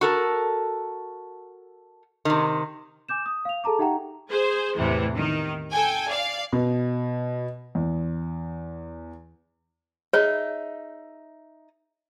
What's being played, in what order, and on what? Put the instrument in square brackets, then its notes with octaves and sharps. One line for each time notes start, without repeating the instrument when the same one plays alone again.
[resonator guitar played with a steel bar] F#4 A4 A#4
C3 D#3
[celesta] G#5 D6 G6 E7
D#6
F5 F7
G#4 A4 A5 A#5 D6
D#4 G4 E5 F#5 G5 A#5
[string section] G#4 C5
E2 A2 C3 E3
D#3
A4 G5 G#5
D5 F5
[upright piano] B2
E2
[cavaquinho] D#4 E5 [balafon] G#4 [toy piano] C#5